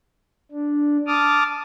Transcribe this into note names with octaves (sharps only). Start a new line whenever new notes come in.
D4
A5 D6 D#6 F6